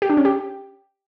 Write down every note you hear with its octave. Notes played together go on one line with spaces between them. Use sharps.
G4
D4
C#4
G4